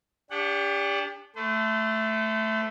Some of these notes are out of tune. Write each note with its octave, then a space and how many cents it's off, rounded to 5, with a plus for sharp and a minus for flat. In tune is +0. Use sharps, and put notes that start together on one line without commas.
D4 -25 G4 +30 F#5 +0
A3 +0 C5 -40